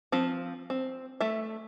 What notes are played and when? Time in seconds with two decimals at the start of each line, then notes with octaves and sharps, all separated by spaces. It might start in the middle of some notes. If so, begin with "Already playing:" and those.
0.12 F3 C4
0.70 C4
1.20 A3 E5